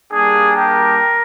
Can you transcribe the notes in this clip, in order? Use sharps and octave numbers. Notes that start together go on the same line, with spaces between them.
G3 A#3 D4 G#4
G4 A#4